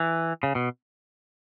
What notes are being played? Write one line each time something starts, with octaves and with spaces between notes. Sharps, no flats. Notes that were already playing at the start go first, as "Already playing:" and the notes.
Already playing: E3
C#3
B2